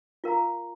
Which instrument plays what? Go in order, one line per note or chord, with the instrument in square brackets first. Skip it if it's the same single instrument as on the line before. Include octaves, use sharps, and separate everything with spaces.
[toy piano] F4 A#4 F5 A#5